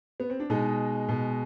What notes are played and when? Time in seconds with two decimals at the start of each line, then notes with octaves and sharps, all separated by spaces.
0.20 B3
0.30 C4
0.40 D4
0.50 B2 G#3 D#4
1.09 B2 G#3